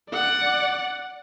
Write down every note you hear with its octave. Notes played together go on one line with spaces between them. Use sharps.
D5 F#5